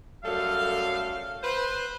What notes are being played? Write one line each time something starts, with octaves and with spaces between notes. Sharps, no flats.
F#2 G3 A3 A4 F5
B4 C5